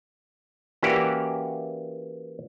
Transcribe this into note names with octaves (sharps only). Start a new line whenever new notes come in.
E3 A#3 C#4 F#4 G4 D5